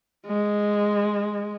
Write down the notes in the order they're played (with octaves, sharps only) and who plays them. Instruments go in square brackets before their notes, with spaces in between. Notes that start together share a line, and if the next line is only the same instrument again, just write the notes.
[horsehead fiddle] G#3